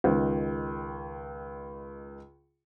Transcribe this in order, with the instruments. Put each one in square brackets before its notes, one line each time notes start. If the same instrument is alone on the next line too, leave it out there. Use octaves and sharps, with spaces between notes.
[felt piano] C#2 D#3